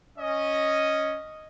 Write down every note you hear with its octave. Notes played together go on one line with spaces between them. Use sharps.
C#4 D#5